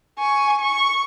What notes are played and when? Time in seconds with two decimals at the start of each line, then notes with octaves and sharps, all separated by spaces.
0.19 G#5 C#6
0.60 C#6